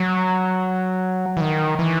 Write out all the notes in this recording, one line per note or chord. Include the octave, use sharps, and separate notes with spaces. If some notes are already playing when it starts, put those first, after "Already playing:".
Already playing: F#3
E3
D#3
E3